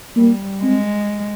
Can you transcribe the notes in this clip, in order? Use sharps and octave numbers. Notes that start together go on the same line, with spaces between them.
G3 A#3
G#3 C4